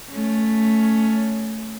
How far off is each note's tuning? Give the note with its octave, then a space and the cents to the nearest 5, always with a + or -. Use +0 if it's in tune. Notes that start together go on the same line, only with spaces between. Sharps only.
A3 +0 C#4 +10